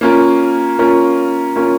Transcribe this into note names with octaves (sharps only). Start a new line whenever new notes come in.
A#3 C#4 F4 A#4
A#3 C#4 F4 A#4
A#3 C#4 F4 A#4